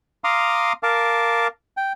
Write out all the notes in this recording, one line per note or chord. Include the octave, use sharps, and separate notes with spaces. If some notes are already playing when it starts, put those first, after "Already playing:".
F5 A#5 C6 D6 D#6 F6
A#4 F5 A5 D6
G5